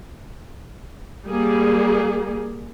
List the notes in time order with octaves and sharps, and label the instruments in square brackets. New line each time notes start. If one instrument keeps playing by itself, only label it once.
[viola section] G3 A#3 G#4